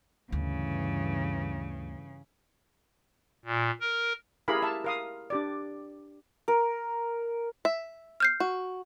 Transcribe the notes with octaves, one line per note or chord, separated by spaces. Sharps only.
D2 G2 C#3 E3
A#2
A#4
E4 G4 G#4 A#4 F5 B5
E5 A5
A#4 F5 D#6
D4 G4 D5
A#4
E5
F6 G6 C7
F#4